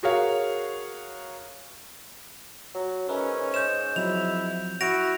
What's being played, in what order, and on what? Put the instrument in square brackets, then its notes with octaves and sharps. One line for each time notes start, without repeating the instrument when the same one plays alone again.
[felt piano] F#4 G#4 A#4 C#5 F5
[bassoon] F#3
[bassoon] G#2 [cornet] C#4 [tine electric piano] A#4 B4 E5
[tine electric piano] C5 C#5 D#5 [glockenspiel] G6 E7
[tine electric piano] F3 F#3 C4 [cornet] E4 [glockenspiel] F7
[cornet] E4 [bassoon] F#4 [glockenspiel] A#6 D7 F7